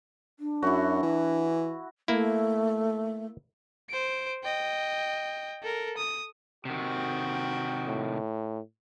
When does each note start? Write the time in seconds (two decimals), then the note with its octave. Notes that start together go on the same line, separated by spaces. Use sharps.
0.40 D4
0.62 F#2 E4 F#4
1.02 E3
2.08 A3 A#3 E4
3.89 C5 D7
4.44 D#5 G5
5.62 A4 A#4
5.97 D#6
6.65 C3 D#3 F#4 G5
7.87 A2